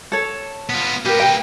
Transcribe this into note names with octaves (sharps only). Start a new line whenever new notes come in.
A4 C#5
B3 F4
A#3 G4 A#4 B4
G5